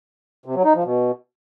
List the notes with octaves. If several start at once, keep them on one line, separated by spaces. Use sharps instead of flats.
C3
F#3
D#4
F3
B2